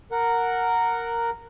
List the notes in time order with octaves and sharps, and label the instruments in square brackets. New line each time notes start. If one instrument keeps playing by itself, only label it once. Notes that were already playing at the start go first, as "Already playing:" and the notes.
[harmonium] A#4 F#5